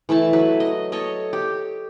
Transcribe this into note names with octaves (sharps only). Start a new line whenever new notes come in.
E3 A3 E4 A5
F#3 B4
D#5
A4 C#5 D#5
G4